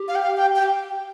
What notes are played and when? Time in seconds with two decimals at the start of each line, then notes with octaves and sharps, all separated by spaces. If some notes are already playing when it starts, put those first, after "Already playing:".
Already playing: G4
0.08 F5
0.15 G5
0.23 F5
0.37 G5
0.56 G5
0.60 G4